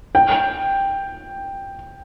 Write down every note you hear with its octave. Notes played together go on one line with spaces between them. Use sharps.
G5